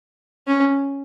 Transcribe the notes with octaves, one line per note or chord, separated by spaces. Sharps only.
C#4